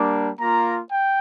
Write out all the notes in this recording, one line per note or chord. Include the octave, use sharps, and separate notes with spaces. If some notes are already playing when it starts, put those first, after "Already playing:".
Already playing: G3 A#3 D4
A#3 F4 A#5
G5